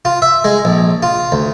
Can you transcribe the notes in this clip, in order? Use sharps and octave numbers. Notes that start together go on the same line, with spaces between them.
F4
E5
G#3
A#1
F4
D2